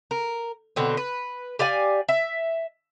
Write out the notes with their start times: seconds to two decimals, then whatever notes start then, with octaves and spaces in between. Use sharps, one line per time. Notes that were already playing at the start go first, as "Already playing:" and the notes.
0.11 A#4
0.76 B2 D3 C4
0.97 B4
1.59 G4 D5 F5 G#5
2.09 E5